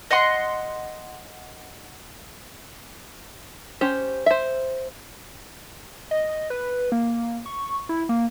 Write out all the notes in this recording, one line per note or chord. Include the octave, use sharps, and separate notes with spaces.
D#5 F#5 C6
C#4 G4 C5
C5 E5
D#5
B4
A#3
C#6
E4
A#3